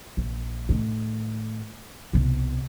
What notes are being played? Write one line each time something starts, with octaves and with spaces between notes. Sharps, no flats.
A#1
A2 D#3
C2 B2